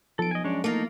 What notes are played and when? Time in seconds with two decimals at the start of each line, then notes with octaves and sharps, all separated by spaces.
0.19 B1 F3 A4 D7
0.31 D#5 G#5
0.44 F#2 G#3 D4 C#5
0.64 E2 A3 A#3 D#4 F4 A#4